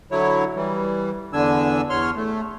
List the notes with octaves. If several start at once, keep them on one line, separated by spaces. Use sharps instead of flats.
D3 F#3 E4 C#5
E3 G3
E2 D3 D4 G#5 E6
E2 C#5 C6 F6
A3